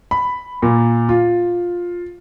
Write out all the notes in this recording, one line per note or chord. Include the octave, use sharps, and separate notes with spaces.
B5
A#2
F4